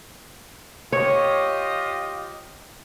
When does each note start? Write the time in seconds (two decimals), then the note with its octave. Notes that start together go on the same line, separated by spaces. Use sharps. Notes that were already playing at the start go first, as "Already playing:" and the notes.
0.92 F4 G4 C#5 D#5